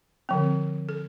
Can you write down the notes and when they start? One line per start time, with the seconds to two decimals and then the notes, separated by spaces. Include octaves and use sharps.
0.29 D3 F3 C4
0.89 A4